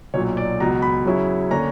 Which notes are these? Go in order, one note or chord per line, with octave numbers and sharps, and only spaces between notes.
B1 A#2 F#3 C#5
D5
C#2 B2 F#3 A#5
B5
F#2 C#3 F#3 C#4 E4
D3 A#3 C#4 A#5